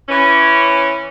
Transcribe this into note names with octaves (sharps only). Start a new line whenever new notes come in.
E3 C#4